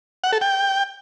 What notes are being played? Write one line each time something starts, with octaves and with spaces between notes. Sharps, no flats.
F#5
A4
G5